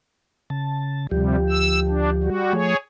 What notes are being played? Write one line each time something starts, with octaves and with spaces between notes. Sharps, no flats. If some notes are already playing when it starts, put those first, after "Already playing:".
C#3 A5
D2 C3 F3 G3 G4
E6
D4
G3 F#4
F3 A3 G#4 C#5